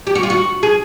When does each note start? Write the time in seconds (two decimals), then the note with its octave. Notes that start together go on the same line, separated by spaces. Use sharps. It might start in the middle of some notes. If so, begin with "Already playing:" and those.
0.07 G4
0.15 F#4
0.23 F4
0.30 F#4
0.63 G#4